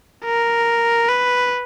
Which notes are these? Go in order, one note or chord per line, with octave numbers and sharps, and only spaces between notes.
A#4
B4